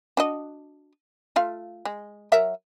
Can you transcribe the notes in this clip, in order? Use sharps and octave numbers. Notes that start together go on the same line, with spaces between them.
D4 F#4 D#5
A3 F4 F5
G#3
F#3 A#4 E5